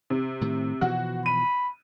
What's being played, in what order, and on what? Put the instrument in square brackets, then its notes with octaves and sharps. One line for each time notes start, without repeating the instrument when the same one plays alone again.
[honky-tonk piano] C3
[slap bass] A2 D#3
[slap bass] B2 E3 F3 [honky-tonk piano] F#4
[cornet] B5 [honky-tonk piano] D#7